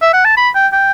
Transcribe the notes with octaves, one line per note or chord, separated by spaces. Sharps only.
E5
F#5
A5
B5
G5
G5